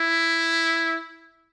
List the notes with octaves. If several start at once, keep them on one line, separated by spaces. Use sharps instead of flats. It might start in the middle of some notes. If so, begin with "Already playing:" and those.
Already playing: E4